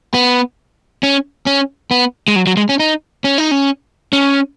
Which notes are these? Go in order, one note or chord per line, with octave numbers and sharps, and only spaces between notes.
B3
C#4
C#4
B3
G#3
F#3
F#3
G#3
C#4
D#4
C#4
D#4
C#4
C#4